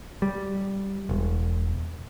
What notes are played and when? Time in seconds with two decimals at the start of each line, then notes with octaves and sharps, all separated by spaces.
0.22 G3
1.09 E1